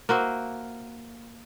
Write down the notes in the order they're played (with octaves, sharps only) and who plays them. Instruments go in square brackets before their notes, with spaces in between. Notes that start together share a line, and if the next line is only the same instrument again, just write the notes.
[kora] A#3 F#4 C5 E5